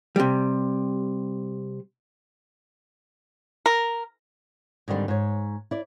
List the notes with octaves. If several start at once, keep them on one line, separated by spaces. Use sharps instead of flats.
C3 G3
A#4
G#2 D3 D#3 G3 C4
G#2 C#5
E4 D5